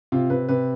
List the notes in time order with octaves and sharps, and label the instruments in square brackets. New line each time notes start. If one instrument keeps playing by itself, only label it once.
[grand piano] C3 F4
C3 B4
C3 B4